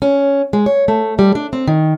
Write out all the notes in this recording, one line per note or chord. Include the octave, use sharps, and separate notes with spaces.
C#4
G#3
C#5
A3
G3
D4
C4
D#3